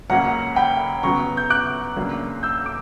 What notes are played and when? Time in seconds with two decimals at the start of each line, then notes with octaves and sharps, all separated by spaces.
0.10 C#2 C#3 F#3 A#3 C#4 F#5 A#5
0.56 G5 B5
1.03 C#3 F#3 B3 A#5 C#6
1.37 G6
1.50 D6 F#6
1.96 C#2 C#3 F#3 A#3 D4
2.43 E6 G6
2.66 D6